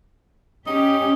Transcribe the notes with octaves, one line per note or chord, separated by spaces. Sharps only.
C#4 D#4 G4